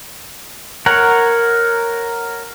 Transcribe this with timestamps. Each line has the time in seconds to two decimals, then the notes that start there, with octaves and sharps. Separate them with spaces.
0.86 A#4 C#5 F#5